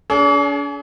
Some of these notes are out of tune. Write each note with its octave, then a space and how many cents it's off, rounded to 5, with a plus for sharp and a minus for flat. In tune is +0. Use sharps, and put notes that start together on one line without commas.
D4 -45 G#4 +30